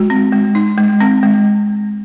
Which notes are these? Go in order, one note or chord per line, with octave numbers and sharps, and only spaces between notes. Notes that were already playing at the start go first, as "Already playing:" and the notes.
Already playing: G#3 F#4
C4
G#3
D#4
G#3
C4
G#3